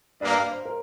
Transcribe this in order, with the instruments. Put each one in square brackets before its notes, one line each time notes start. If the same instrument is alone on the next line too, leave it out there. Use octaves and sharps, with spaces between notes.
[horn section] G2 G3 A#3 [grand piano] D5
[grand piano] F5
C5
A#4